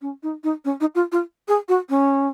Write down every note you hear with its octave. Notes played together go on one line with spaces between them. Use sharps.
C#4
D#4
D#4
C#4
D#4
F4
F4
G#4
F#4
C#4